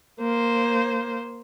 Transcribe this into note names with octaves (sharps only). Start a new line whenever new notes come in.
A#3 C5